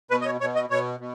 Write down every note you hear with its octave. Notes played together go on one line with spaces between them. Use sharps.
B2 B4
D#5
C#5
B2 C#5
D#5
B2 C#5
B2